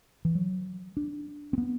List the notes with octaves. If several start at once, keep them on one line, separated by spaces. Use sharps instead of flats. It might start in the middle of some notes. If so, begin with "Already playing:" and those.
E3
F#3
D4
C4
B3